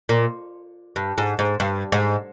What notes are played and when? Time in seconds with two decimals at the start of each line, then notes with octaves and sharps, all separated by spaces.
0.09 A#2
0.96 G2
1.18 G#2
1.39 G#2
1.60 G2
1.92 G#2